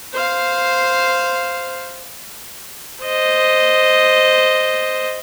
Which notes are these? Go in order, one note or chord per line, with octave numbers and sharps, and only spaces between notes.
C5 F5
C5 D#5